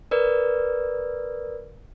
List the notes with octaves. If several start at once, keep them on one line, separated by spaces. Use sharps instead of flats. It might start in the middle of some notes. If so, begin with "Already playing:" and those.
A#4 B4 D5